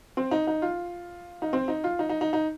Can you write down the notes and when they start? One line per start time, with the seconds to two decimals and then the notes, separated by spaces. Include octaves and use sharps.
0.17 C4
0.31 D#4
0.47 D#4
0.62 F4
1.42 D#4
1.53 C4
1.68 D#4
1.84 F4
1.99 D#4
2.09 D#4
2.21 D#4
2.33 D#4